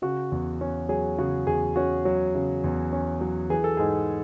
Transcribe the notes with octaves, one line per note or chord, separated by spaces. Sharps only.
C#3 F#4
E2
C#4
F#3 G#4
C#3 F#4
E2 G#4
C#4 F#4
F#3
C#3
E2
C#4
F#3
E3 G#4
A4
G#2 G#4